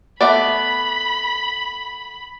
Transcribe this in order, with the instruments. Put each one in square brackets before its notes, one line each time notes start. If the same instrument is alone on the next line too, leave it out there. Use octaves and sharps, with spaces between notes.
[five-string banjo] A3 B3 D5 [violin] B5